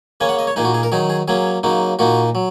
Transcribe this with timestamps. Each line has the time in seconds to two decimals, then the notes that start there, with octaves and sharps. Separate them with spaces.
0.21 C#3 A#3 C#4 G#5
0.29 F#5
0.39 D#5
0.47 C#5
0.56 A#2 A#3 D#4 G#4
0.65 F#4
0.74 G#4
0.83 A#4
0.92 D#3 F#3 D#4 G#4
1.10 G#4
1.28 F#3 A#3 C#4 G#4
1.63 C#3 F#3 A#3 D#4
1.99 A#2 A#3 D#4 F#4
2.35 F#3